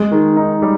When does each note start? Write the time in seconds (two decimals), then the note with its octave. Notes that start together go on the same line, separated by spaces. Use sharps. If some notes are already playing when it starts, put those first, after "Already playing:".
Already playing: G#3
0.11 D#3
0.37 D#4
0.62 G3